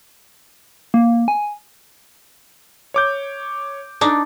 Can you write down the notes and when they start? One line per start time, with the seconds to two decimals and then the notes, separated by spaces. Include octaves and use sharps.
0.94 A#3
1.28 G#5
2.94 C#5 D6 G6
4.01 D4 D#4